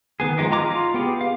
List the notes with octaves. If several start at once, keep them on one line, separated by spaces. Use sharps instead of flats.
D#3 B3 G#4
F3 G#3 D#4 G4
F4 D#5 A#5 D6
F4
B3 G4 G#4
F5